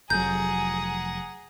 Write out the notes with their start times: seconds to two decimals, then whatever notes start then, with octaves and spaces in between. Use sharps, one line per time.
0.10 F1 F#3 G#4 F#5 A#5 G6